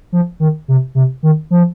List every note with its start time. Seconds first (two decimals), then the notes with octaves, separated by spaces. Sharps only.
0.12 F3
0.40 D#3
0.68 C3
0.95 C3
1.23 D#3
1.51 F3